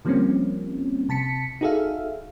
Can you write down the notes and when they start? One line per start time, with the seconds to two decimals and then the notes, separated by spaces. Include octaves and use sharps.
0.05 D3 F3 G3 A#3 C4 C#4
1.09 C3 A5 B6 C#7
1.61 D#4 F#4 G#4 A4 E5 F5